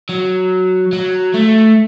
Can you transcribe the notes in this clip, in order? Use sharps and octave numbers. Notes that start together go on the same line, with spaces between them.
F#3
F#3
A3